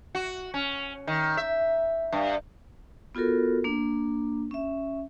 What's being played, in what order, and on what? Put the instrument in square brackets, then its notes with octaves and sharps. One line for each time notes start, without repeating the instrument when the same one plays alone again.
[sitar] F#4
C#4
D#3
E5
G2
[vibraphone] B3 F4 F#4 A4 A#4
A#3 D4
C#4 E5